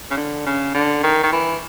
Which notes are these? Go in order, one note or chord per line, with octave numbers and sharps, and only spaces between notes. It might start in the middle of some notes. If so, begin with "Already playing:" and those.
C#3
D3
C#3
D3
D#3
D#3
E3